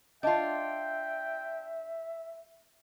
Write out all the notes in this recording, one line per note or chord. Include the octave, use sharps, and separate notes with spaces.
D4 F4 D#5 E5 G5 A5